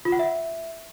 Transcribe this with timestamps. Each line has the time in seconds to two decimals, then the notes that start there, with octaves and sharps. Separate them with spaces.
0.05 F4
0.12 F#5
0.19 E5